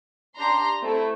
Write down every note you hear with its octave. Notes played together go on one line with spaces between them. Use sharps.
D4 G4 A#5 C6
A3 C4 E4 A4